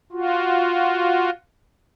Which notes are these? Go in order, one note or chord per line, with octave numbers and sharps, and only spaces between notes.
F4 F#4